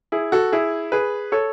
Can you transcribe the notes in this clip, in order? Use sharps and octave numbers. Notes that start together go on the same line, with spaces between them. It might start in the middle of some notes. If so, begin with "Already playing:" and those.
E4 G#4
F#4 A4
E4 G#4
G#4 B4
A4 C#5